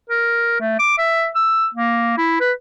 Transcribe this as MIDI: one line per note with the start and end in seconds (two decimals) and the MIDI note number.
0.10 0.59 70
0.60 0.75 57
0.79 0.97 86
0.98 1.28 76
1.35 1.67 88
1.75 2.13 58
2.18 2.40 64
2.40 2.52 71